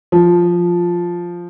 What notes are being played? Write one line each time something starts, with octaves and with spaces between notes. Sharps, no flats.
F3